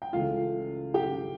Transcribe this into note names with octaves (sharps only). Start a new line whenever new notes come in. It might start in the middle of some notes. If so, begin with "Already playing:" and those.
G5
C#2 C#3 E3 A3 C#4 F4 F5
G4 G5